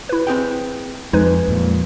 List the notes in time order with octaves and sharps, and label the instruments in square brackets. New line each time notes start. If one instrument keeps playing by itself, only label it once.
[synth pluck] E4 B4
[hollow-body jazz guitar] C4 G#4 G5
[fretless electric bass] F2 [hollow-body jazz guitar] G#3 [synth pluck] D#4 B4
[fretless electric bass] F2 A#2